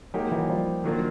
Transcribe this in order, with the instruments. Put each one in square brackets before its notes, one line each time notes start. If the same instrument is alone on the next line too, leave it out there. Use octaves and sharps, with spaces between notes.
[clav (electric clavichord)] F#3 G#3 [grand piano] A#3 D#4 G4
[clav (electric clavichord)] E3 F#3
F3 G3
[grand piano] D#3 F#3 A#3 D4 F4